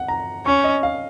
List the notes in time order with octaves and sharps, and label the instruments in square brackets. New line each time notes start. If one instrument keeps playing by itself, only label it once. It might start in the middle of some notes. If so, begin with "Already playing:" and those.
Already playing: [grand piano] F#5
A#5
[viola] C#4 [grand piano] C#6
[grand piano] D#5
F5